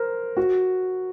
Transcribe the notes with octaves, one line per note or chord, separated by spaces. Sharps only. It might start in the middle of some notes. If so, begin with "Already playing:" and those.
Already playing: A#4 C5
F#4